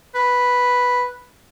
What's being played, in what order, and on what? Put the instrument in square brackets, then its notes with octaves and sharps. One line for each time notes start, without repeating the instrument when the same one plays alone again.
[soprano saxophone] B4